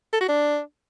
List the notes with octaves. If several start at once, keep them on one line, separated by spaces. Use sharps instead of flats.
A4
F#4
D4